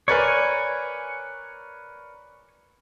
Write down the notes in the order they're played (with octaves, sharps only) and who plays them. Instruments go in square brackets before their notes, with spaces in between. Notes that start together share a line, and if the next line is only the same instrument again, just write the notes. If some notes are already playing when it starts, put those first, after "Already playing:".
[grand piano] A#4 B4 D5 [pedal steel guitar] C#5 G#5